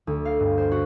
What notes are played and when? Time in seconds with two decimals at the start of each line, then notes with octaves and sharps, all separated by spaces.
0.07 D2
0.25 F5
0.39 G2
0.58 C5
0.72 F#4